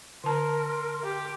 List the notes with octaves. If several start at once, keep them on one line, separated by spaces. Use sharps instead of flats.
D3 A#4 A5 A#5 C6
G4